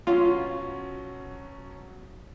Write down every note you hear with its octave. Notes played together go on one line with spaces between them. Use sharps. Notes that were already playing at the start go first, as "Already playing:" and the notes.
B2 F#3 C#4 F4